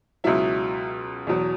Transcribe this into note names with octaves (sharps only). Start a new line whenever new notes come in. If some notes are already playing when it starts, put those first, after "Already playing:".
C#2 B2 F#3 E4
E2 B2 F#3